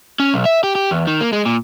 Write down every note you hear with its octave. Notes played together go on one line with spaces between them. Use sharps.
C#4
B1
E5
G4
G4
E2
D#3
A#3
G#3
A#2